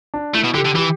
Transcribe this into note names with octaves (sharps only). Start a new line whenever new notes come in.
D4
A3 E4
B2
D3 G4
D3
E3 G4